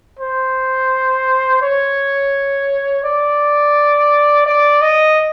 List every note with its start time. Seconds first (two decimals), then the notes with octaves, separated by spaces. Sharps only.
0.19 C5
1.61 C#5
3.04 D5
4.46 D5
4.82 D#5